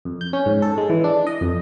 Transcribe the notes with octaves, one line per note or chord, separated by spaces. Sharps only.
F2
G6
C#4
G#2
A4
G#3
E3
D4
D#5
F2